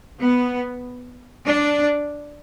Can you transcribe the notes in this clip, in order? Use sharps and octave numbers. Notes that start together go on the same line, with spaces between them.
B3
D4